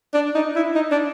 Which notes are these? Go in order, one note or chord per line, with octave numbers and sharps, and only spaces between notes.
D4
D#4
E4
D#4
D4